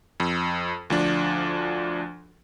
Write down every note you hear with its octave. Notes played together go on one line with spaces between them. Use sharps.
F2
D2 F3 D4